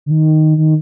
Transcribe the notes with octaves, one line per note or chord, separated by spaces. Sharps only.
D3
D#3
D#3